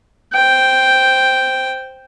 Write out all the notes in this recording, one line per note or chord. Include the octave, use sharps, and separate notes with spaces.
C5 G5